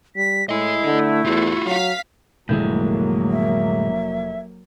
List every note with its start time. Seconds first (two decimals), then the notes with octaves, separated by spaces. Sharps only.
0.16 G3 B6
0.49 A2 E4 D#5 G#5
0.84 D3 A3
1.25 E2 F4 F#4
1.66 F#3 F5 B6
2.49 F1 A2 D3 F#3 G#3 A#3 E4 G6
3.30 E5